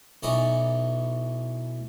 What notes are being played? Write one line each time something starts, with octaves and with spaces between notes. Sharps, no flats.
B1 E3 C#4 D#4 D5 B5